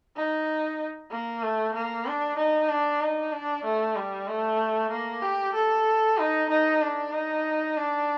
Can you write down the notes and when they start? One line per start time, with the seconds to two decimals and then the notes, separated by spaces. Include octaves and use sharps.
0.16 D#4
1.11 A#3
1.43 A3
1.74 A#3
2.06 D4
2.38 D#4
2.69 D4
3.01 D#4
3.33 D4
3.65 A3
3.96 G3
4.28 A3
4.91 A#3
5.22 G4
5.54 A4
6.18 D#4
6.49 D#4
6.82 D4
7.12 D#4
7.76 D4